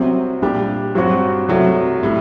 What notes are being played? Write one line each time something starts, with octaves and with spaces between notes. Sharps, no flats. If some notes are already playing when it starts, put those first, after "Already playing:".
Already playing: C2 C3 F#3 C4
A#2 G3 D4 G4
G2 F#3 C4 F#4
C2 C3 F#3 A3
A2 G3